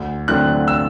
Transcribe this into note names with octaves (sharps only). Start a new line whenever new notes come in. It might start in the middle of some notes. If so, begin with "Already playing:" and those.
Already playing: D2
D3 F#3 A3 C4 F#6
E6